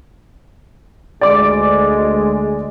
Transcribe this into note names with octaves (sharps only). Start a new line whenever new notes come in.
D2 G#3 D5 D6